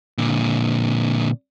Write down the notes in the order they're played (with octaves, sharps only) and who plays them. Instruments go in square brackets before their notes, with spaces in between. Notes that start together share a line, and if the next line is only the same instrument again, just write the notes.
[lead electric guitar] A#2 D3